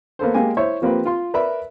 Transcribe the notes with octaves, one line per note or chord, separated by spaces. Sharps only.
A#3 B3 A4 C5
G#3 A#3 G4 G#5
E4 C5 C#5 E5
F3 A#3 C4 G4 B4
F4 C6
A#4 B4 D5 E5 B5